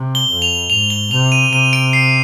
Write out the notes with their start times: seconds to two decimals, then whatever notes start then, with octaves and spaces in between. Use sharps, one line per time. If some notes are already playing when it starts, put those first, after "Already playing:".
Already playing: C3
0.15 G7
0.29 F2
0.42 F7
0.70 G#2 F7
0.90 G7
1.11 C3 F7
1.32 D#7
1.52 C3 D#7
1.73 D7
1.93 C7